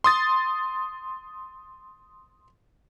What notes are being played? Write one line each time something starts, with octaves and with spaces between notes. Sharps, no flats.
C6 D#6 A6